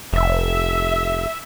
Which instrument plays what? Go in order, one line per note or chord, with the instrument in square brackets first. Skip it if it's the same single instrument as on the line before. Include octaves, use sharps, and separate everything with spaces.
[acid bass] F1 [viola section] E5